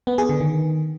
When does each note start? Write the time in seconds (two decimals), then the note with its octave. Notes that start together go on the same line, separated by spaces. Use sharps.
0.07 B3
0.18 G#4
0.29 D3
0.40 D#3